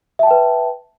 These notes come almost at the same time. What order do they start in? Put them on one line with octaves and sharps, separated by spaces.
E5 A5 G5 B4